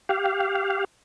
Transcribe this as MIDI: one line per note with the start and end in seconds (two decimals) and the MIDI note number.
0.09 0.84 67
0.09 0.84 77